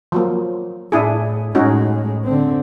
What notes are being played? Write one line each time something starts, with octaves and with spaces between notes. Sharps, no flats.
F3 F#3 A#3
A2 D4 E4 G#4
A2 G#3 C#4 D#4 F#4
D3 C4